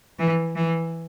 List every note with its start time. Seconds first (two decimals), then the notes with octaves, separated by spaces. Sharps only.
0.19 E3
0.55 E3